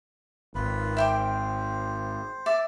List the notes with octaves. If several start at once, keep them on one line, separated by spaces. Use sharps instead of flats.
G#1 F4 B4 B5
C5 E5 G5 D6
D5 E5 D6